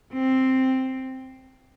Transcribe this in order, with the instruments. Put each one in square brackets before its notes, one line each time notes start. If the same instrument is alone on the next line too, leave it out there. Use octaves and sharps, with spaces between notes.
[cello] C4